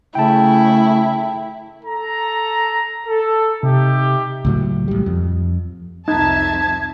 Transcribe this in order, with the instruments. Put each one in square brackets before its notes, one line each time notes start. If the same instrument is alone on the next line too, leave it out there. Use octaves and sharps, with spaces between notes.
[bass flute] C#3 [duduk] A3 [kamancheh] E4 [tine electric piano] G5 A5
[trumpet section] A4 A#5
A4
[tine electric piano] C3 [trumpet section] D#4 G4 E5
[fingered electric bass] C#2 A2 F#3
A1 G3
F2
[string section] C2 F2 E5 [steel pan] D#4 [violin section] A5 [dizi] G#6